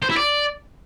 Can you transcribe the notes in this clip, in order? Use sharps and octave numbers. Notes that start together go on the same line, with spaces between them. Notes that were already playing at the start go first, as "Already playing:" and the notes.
C5
E4
D5